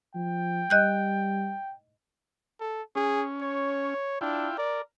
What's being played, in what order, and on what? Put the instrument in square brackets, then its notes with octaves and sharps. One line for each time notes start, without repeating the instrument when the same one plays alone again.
[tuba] F3 [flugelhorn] G5
[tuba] G3 [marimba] D#5 F#6 G6
[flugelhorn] A4
[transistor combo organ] C#4 [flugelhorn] G#4
[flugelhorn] C#5
[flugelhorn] D4 [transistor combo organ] E4 F4 G5
[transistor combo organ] A#4 [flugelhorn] D5